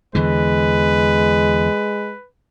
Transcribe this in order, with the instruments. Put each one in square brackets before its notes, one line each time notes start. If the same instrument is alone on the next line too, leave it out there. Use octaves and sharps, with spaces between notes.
[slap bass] E2 D3 E3 [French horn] G#3 [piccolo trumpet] B4